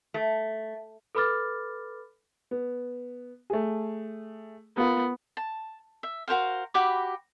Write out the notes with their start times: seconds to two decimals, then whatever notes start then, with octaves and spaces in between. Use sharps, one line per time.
0.14 A3
1.15 A4 B4 B5 D6 F6 A6
2.51 B3
3.50 A3 G#4
4.77 B3 F4 A#4
5.37 A5
6.03 E5
6.28 F#4 A#4 C5 F5
6.74 F#4 G4 B5 D6